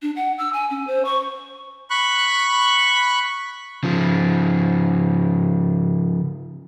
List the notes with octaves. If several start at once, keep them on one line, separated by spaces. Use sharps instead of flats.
D4
F#5
E6
G#5
C#4
C5
C#6
B5 C#6 F#6
C#3 F3